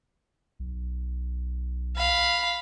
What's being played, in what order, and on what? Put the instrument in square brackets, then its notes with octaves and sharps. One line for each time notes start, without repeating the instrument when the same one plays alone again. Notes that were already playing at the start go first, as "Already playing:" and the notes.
[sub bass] B1
[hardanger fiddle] F5 B5